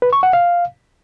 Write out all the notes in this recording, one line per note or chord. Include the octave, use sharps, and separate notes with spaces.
B4
C#6
F#5
F5